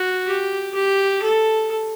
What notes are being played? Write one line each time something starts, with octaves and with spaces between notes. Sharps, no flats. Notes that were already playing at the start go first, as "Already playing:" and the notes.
Already playing: F#4
G4
G4
A4